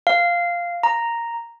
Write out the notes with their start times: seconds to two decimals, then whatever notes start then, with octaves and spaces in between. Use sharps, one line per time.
0.07 F5
0.83 A#5